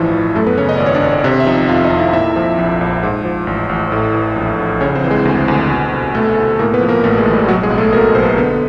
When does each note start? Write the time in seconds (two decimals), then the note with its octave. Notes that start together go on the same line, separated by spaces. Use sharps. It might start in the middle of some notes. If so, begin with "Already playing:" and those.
Already playing: A1 G2 E3 F3 E4 F4
0.13 A1
0.36 F#2 A3 A4
0.47 B3 B4
0.58 C#3 C#4 C#5
0.69 D#5
0.77 G#1 D5
0.86 C#5
0.94 D4 D5
1.03 G#1
1.24 C3
1.40 E5
1.47 F3 D#4 D#5
1.69 F2 F4 F5
1.84 D#4 D#5
1.91 F2
1.99 E4 E5
2.13 A#2 E4 E5
2.36 F3
2.58 A#1
2.81 A#1
3.03 G#2
3.25 F3
3.47 A1
3.69 A1
3.92 A2
4.14 E3
4.36 A#1
4.59 A#1
4.81 C#3 C#4 C#5
4.95 C4 C5
5.04 E3
5.10 G#3 G#4
5.25 D2
5.48 D2
5.70 B2
5.92 C2
6.15 B2 A3 A4
6.37 C2
6.59 A2 A#3 A#4
6.74 B3 B4
6.81 F3
6.88 A#3 A#4
7.03 A1 A3 A4
7.18 G#3 G#4
7.26 A1
7.33 G3 G4
7.48 B2 F#3 F#4
7.63 G#3 G#4
7.70 B1
7.78 A3 A4
7.92 B2 A#3 A#4
8.15 B1 C5
8.23 B4
8.30 A#4
8.37 D3 B3 B4